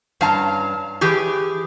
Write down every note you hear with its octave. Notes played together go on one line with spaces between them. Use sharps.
G2 C#4 F5 A5 A#5
E3 G4 G#4